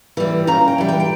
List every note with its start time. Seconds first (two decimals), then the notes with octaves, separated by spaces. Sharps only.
0.17 E3 G3
0.47 C#3 A#5
0.68 G5
0.78 E3 G3
0.89 G5
1.00 G5